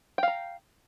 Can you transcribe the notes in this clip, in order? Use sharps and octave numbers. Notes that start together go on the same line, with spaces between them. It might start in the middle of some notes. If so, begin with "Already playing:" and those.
F5 G5 A#5